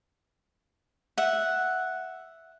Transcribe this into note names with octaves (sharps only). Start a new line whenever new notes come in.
E5 F#5